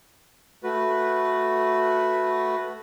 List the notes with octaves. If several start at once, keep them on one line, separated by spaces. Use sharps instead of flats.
A3 F#4 B4